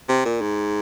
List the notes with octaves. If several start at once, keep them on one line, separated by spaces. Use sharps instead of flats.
C3
A#2
G#2